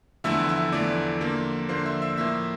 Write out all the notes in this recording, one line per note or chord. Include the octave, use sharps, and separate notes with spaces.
E2 D3 F3 A3 E4 E5 E6
E5 E6
E2 D3 F3 A3 E4 D5 D6
D3 F3 A#3
D3 F3 A#3 C5 C6
E5 E6
E5 E6
A2 F3 A#3 E5 E6